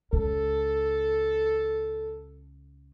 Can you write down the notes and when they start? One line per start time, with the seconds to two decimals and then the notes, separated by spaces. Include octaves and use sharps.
0.13 C#2 A4